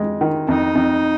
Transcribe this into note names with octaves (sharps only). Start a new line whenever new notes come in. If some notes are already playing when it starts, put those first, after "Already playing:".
Already playing: F2 G#3
D#3
F2 D#4
F2